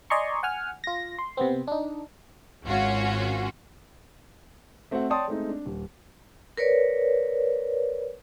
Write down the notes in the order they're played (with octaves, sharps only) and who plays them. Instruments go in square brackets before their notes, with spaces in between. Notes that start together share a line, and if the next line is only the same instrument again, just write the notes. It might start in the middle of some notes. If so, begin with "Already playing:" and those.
[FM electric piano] D5 D#5 G#5 A#5 C6 C#6
F#5 G#5 F6
F4 A#6
C6
C3 B3 C4
D4 D#4
[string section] G#1 C#4 F4 F#4
[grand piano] A3 C4 F#4 C5 F#5
C#5 D5 G5 A5 C6 D#6
G#3 A3 C4 D#4
D4
D#1
[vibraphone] A#4 B4 C#5 D5